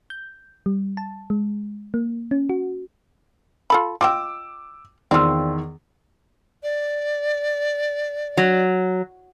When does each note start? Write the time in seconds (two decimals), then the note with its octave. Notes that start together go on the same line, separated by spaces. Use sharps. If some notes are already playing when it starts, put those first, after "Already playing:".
0.10 G6
0.66 G3
0.97 A5
1.30 G#3
1.94 A#3
2.31 C#4
2.49 F#4
3.70 F4 A4 B5
4.01 F4 D#5 G5 D6 E6
5.11 E2 D#3 C4 F4 D5 C6 E6
6.63 D5
8.37 F#3